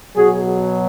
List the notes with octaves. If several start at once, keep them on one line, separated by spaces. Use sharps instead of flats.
B2 F#3 F#4 G#4